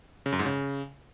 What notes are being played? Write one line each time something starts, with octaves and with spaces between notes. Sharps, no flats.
C#3
F#2
G#2
C#3